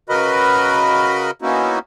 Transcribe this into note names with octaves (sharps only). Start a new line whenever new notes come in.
C#3 F#4 A#4 B4 D#5 B5
A#3 B3 C#4 D#4 E4 F#4